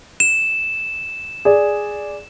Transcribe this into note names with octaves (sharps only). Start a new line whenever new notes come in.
E7
G#4 D5